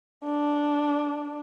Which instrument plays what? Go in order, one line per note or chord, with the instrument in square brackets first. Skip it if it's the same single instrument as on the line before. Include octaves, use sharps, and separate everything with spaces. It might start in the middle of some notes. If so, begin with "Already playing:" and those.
[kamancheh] D4